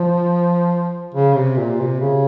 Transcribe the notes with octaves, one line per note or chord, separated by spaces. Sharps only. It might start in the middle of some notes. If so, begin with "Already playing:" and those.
Already playing: F3
C#3
C3
A#2
C3
C#3